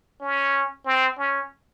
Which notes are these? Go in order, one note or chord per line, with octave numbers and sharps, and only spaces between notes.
C#4
C4
C#4